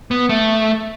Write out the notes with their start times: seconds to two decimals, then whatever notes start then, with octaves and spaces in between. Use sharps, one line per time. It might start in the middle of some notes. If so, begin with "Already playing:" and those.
0.11 B3
0.29 A3